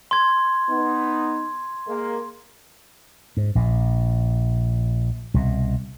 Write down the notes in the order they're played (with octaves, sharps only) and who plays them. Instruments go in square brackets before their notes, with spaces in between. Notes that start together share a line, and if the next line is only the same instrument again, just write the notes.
[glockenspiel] C6 G#6
[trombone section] B3 D#4
G#3 A#3
[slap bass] G#2
A#1 A#2
C2 B2